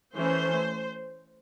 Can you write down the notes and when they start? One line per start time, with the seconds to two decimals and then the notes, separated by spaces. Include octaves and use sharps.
0.15 E3 A3 C#4 C5